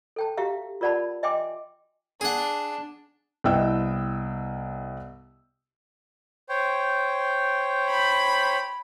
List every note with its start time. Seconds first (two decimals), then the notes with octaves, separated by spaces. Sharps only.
0.16 A4 G5 A5
0.37 F#4 G4 E5 F5 A#5
0.81 F4 A#4 D5 F#5 A5 B5
1.23 D#5 E5 G5 G#5 C6 D6
2.21 D4 G#4 F#5
3.44 C2 B3 E4 D#5 G5 E6
6.49 C5 C#5 G5
7.90 B5